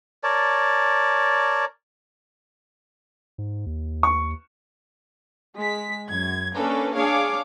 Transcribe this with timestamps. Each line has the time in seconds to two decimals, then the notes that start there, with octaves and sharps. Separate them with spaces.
0.24 A#4 C#5 D5 A5
3.38 G#2
3.66 D#2
4.03 C#6
5.57 G#3 B6
6.06 F#2 G#6
6.55 A#3 C#4 D4 A4 B4
6.95 D4 G#4 C#5 F5 D6